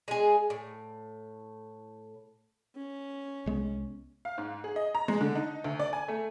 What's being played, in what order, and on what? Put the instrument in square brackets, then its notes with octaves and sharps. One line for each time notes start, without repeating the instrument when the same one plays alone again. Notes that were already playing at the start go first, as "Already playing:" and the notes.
[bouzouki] G#3 G#4
A2
[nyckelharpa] C#4
[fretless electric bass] C2 G#3 B3
[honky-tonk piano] F5
G#2
G#4
D#5
A#5
G#3
D3
D#4
D2
D5
G#5
A3